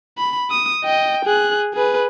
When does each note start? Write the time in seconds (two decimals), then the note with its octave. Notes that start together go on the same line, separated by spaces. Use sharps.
0.18 B5
0.51 D#6
0.84 D#5 G5
1.25 G#4 F#6
1.74 G#4 B4